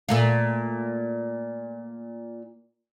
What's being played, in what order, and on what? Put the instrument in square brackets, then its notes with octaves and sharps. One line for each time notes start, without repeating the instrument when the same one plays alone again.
[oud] A#2 A3 F4